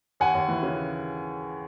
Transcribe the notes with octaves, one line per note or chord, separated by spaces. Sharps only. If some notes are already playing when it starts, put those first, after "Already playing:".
D#2 F#5 G#5
D#2
E3
C#3